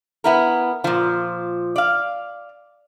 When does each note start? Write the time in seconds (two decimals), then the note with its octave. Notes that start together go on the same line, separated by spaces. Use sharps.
0.24 B3 E4 A#4
0.84 A#2 F3
1.76 D5 F5